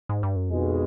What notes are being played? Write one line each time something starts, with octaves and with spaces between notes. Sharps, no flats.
G#2
G2
F#2
B1 F2 B2 G#3